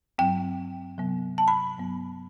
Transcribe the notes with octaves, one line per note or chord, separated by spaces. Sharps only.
G2 F#3 C4 G5
C3 F#3 B3
A5
B5
G2 F#3 B3